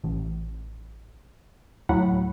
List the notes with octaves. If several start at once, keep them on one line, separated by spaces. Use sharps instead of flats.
A1
D2 A2 F#3 F#5 B5